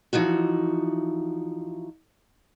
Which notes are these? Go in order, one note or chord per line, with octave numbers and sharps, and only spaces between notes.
E3 F3 D#4 F#4